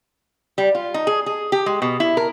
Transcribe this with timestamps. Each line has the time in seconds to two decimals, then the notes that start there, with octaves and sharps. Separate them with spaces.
0.58 G3
0.75 F4
0.94 D#4
1.07 G#4
1.26 G#4
1.52 G4
1.66 G#3
1.82 B2
2.00 E4
2.17 A#4